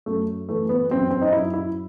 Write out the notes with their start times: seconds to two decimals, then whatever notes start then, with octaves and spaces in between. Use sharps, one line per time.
0.06 F#2 A3
0.49 E3 A3
0.69 B3
0.90 F#2 C4
1.11 C4
1.21 D#4
1.33 F#2 E4
1.54 E4